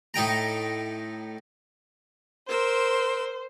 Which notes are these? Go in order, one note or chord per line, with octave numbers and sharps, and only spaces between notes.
A2 D#4 G5 A#5
A#4 C5 C6 E6